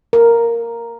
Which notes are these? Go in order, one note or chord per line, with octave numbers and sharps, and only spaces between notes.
A#4